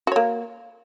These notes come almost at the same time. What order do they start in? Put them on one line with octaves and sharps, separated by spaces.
F#4 C#5 A#3